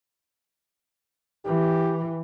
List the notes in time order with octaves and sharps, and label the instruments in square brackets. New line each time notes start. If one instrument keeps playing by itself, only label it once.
[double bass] E3 [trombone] G4